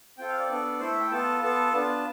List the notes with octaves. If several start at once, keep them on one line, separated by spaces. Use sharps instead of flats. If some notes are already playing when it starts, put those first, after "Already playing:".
C4 F4 A4 G5
F5
D5
B3 D4 A4
A3 E4 A4 C5
E5
G5
B3 F4 A4 A5
B3 F4 A4 A5
B3 D4 F4 A5